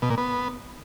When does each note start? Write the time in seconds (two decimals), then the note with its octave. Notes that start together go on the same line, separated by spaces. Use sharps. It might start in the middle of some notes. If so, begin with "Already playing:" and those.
0.02 B2
0.10 A#2
0.18 B3